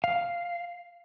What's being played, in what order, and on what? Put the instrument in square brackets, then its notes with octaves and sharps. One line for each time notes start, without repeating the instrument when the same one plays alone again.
[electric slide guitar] F5